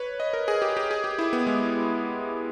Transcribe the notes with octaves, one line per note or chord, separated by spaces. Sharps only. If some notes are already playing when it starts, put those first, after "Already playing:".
Already playing: B4 C#5
D#5
A#4
G#4
G4
G4
G#4
G4
E4
B3
G#3